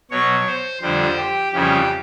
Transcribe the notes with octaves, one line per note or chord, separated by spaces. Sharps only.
B2 F#3 C#5
C5
F2 D3 G3 C5
G4
F2 C#3 E3 G3 G4